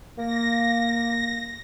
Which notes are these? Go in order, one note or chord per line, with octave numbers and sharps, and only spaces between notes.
A#3 A#6